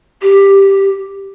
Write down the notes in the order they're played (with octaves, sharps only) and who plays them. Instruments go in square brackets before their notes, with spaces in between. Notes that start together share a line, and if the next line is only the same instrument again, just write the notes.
[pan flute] G4